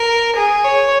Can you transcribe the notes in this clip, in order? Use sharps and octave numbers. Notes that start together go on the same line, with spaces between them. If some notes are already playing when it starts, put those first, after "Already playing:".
Already playing: A#4
G#4
C#5